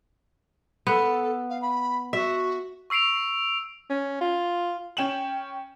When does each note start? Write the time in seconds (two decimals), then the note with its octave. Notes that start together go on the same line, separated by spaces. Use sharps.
0.87 B3 A4
1.49 F5
1.61 B5
2.13 F#4 E5
2.90 C#6 E6 C7 D7 F7
3.90 C#4
4.21 F4
4.97 C#4 G5 E7 F#7